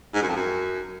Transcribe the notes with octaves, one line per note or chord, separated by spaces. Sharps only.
G#2
F#2
F2
F#2